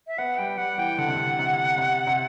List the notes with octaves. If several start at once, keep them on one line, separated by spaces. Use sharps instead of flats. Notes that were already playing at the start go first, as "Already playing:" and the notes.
E5
B3 F#5
G3 G5
G3 F#5
E3 G5
D3 F#5
C3
D3
C3
C3
C3